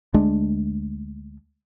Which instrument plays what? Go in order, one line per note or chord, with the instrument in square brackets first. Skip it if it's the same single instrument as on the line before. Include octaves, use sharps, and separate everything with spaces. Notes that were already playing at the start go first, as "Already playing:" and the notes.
[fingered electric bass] D2 G#3 A3 D4